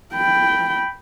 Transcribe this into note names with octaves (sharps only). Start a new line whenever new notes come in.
G5 B5